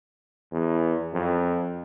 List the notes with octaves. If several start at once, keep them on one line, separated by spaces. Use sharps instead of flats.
E2
F2